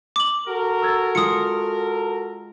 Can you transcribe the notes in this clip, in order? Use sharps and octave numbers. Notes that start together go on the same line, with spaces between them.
D6 F#7
F#4 A4 A#4
E6 G#6 A6
G#3 F4 D#6 C#7